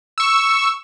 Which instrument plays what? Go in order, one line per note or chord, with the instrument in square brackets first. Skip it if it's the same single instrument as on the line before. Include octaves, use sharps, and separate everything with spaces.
[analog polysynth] C#6 E6